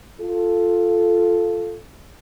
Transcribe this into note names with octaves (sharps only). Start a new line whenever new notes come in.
F4 A4